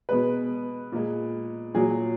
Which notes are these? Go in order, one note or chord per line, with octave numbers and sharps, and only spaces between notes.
B2 G#3 B4
A#2 G#3
A#2 F#3 G#4